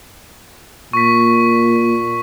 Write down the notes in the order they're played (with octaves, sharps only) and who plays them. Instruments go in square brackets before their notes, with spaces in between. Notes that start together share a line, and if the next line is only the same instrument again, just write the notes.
[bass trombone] A#2 [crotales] C#6 B6